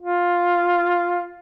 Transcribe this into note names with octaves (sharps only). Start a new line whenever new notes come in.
F4